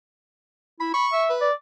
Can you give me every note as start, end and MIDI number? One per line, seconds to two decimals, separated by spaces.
0.80 0.93 64
0.80 0.90 83
0.94 1.07 83
0.94 1.24 85
1.12 1.32 76
1.30 1.48 71
1.41 1.53 74